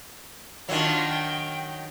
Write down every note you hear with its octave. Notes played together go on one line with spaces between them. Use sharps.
D#3 F#3 D4 F4
G5